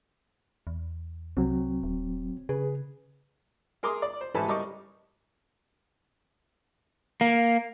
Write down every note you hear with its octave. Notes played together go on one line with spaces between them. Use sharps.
E2
C2 F#3 C4
D#1
C#3 G#4 B4
G#4 A#4 C6 D6 D#6
D5
C5
A1 G#2 A4 B4 G#5 A5
G3 A#4 D#5 C#6 D6
A#3